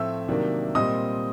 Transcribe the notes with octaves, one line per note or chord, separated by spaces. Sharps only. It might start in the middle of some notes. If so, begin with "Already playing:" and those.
Already playing: A2 F3 A3 C4 E5 E6
C3 D#3 F#3 A#3 D4
A#2 G3 C4 D#5 D#6